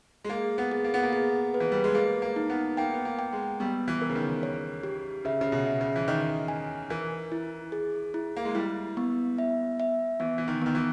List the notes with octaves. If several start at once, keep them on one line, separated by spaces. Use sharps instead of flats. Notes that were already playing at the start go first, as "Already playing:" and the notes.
G#3
A#3 G#4
B3
G#4
A#3
B3
A#3
G#4
B4
E3
G3
G#3
A#3 G#4
A#3
D#4
B3
A#3 G5
B3
A#3
G5
G#3
G3 B3
E3
A#4
C#3
D#3
C#5
G4
C#3 E5
C#3
B2
E5
C#3
E3
D#3 D#5
G#5
E3 A#4
E4
G#4
E4
A#3
G#3
G3 E4
B3
E5
E5
E3 B3
E3
D#3
D#3 B3
E3